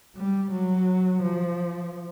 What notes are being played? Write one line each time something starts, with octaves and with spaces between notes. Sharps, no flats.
G3
F#3
F3